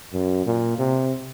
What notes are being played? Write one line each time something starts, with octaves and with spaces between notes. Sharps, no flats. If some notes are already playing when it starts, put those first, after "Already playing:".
F#2
A#2
C3